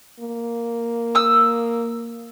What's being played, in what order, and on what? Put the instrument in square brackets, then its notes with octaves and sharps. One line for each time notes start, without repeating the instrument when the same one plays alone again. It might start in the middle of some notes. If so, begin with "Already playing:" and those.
[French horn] A#3
[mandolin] D#6 E6